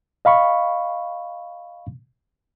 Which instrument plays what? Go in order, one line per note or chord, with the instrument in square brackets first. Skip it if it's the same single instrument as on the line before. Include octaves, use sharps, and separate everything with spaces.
[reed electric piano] D#5 F5 B5 C#6